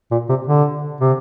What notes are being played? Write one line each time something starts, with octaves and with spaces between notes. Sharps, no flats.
A#2
C3
D3
C3